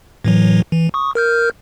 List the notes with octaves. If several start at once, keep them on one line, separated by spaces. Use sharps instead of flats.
A2 E3 F#3
E3
C#6 D#6
A#4 F6 G6